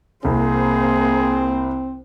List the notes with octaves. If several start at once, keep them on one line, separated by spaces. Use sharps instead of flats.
C2 A#3 C4 G#4 C5